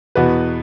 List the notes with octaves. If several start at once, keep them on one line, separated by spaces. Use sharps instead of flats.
E2 B2 B3 F#4 B4